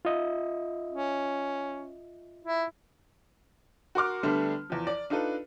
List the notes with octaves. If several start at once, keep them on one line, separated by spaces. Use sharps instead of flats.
F4 D#5 E5
C#4
E4
F#4 A#4 C6 D6 F6
D3 G3 A3 B3 D4
E2 F3
D5
D4 D#4 F4 A4 B4